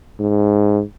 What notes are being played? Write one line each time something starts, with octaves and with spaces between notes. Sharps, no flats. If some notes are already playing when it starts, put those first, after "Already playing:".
G#2